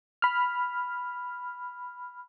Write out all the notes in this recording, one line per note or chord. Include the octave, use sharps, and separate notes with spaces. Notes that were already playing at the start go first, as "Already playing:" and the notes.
B5 F6